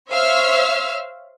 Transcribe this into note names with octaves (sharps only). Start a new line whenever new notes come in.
C5 C#5 E5 F5 E6 F6